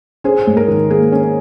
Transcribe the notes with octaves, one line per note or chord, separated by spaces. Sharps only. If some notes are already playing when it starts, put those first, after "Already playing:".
C#4 G#4 C5
G#2
A#4
D#3
A#3 G#4
C#4